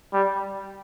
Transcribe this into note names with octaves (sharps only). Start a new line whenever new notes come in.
G3